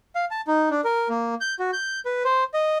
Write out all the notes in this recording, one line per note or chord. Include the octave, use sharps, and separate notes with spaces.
F5
A5
D#4
D4
A#4
A#3
G6
F#4
G6
B4
C5
D#5